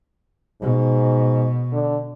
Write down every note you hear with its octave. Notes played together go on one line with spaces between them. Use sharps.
G#2 B2
D3